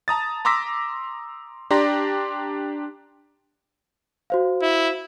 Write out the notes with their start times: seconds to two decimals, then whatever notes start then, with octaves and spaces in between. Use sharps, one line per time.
0.08 A5 A#5 D#6 A6
0.45 A#5 C6 D6 E6 A#6 B6
1.70 D4 G4 D5 A#5 C6 A#6
4.30 F#4 C5 F5
4.62 E4